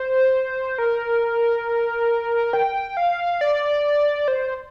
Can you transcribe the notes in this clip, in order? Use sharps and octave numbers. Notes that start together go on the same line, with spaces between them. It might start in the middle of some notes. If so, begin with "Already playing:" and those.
Already playing: C5
A#4
G5
F5
D5
C5